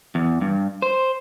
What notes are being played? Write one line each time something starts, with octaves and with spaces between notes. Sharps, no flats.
E2
G2
C5